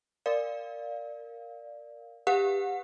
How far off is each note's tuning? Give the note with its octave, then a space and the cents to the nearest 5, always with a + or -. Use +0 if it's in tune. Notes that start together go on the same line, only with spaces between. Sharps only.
A#4 -5 D5 +0 F5 +0
G4 +20 B4 +0 F#5 -30